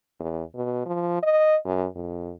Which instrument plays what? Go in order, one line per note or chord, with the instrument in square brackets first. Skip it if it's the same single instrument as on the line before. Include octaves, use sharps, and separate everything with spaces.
[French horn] E2
B2
F3
D#5
F#2
F2